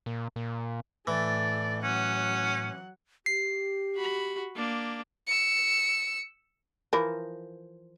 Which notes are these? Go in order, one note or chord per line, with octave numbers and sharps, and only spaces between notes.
A#2
A#2
A2 E3 A4 D5
F#3 C#4 F#5
G4 C7
F#4 B5
A#3 D4
E6 C#7
E3 F3 A#4